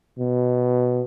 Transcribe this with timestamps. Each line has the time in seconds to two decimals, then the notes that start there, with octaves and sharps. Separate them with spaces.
0.19 B2